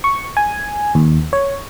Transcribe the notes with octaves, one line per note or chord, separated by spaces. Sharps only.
C#6
G#5
D#2
C#5